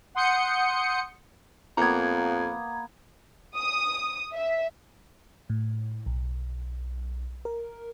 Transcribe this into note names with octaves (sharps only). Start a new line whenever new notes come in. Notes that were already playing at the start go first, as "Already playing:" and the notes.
F#5 C6 D#6 G6 C#7
F2 A#3 B3 A#5 G#6
D#6
E5
A2
B1
A#4